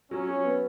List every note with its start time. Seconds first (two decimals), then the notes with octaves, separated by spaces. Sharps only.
0.11 F#3 C#4
0.28 F#3
0.45 B3